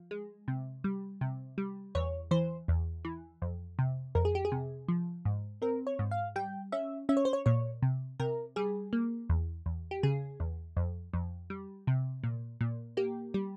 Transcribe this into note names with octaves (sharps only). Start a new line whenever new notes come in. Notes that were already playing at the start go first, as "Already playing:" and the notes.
Already playing: F3
G#3
C3
G3
C3
G3
E2 C#5
E3 C5
E2
E3
F2
C3
F2 A#4
G#4
G4
G#4
C3
F3
G#2
C4 A#4
C#5
G#2
F5
G3 G5
C#4 E5
C#4 E5
C#5
C5
C#5
A#2 C#5
C3
C3 A#4
G3 G#4
A#3
E2
E2
G4
C#3 G#4
E2
F2
F2
G3
C3
A#2
A#2
A#3 G4
G3